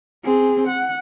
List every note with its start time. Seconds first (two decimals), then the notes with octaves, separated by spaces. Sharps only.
0.24 C4 G#4
0.68 F#5